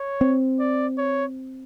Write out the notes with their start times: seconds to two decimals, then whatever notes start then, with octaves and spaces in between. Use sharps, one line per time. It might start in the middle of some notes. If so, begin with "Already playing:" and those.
Already playing: C#5
0.21 C4
0.60 D5
0.98 C#5